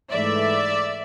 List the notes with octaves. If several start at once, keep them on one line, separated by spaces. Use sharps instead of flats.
G#2 E3 A3 D5 E5